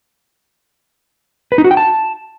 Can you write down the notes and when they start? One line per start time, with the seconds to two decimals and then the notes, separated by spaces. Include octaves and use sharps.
1.52 B4
1.58 D#4
1.64 F#4
1.71 G5
1.77 A5